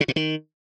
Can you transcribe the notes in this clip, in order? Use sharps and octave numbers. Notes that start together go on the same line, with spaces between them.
C#3
A#2
D#3